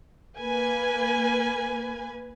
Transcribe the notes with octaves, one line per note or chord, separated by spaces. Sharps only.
A#3 B4 G#5